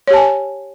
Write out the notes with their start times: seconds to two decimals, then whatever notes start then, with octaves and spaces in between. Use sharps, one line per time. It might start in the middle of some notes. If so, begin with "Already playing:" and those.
0.07 C#5
0.10 G4
0.13 A5
0.16 G#5